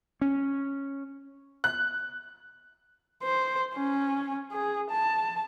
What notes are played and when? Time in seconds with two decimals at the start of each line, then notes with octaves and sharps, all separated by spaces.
0.21 C#4
1.64 F#6
3.23 C5
3.75 C#4
4.52 G#4
4.91 A5